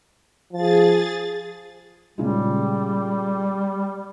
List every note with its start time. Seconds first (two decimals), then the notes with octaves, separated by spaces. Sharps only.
0.53 F3 G#4 A6
2.18 A#2 C#3 G3 G#3